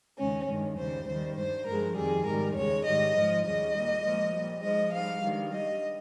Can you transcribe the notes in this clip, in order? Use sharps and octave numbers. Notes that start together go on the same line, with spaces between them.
D#2 C#3 G#3 C#4
G2 D#3 G#3
D#2 C#3 G3 C5
D#2 D#3 G3 C5
G2 G3 C5
G2 F3 G#3 A#4
F2 D#3 G3 G#4
G#2 D#3 G3 A#4
D#2 C#3 G#3 C#5
G#2 D#3 G3 D#5
G#2 F3 G#3
D#2 C#3 G3 D#5
A#2 G3
A#2 F3 G#3
A#2 G3
G#2 F3 G#3 D#5
G#2 G3 F5
G2 D#3 G#3
G2 G3 D#5